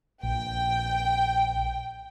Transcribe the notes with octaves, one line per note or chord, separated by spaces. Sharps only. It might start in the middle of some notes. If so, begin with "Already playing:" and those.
A#1 G5